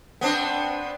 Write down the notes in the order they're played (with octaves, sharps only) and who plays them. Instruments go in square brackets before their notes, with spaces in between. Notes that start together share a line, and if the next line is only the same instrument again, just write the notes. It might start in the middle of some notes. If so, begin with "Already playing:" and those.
[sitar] B3 C4 D4